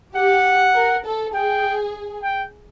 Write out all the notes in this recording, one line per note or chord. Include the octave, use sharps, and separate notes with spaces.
G4 F#5
A#4
A4
G#4 G5
G5